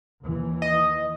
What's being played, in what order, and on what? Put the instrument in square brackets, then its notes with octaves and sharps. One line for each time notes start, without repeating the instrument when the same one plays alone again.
[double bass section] D#2 E3
[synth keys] D#5